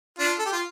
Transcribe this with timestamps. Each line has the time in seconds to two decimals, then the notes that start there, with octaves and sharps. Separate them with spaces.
0.19 D4 F4
0.39 A4
0.46 G4
0.53 F4